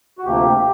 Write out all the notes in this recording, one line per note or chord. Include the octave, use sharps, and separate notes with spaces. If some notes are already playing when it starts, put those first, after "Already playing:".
F#4
D2 C3 F3 A#3 G4
G4